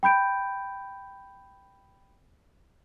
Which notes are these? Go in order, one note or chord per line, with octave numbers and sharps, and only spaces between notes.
G5 B5 G6 D7